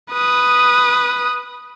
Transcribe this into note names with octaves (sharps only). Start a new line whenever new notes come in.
B4 D#6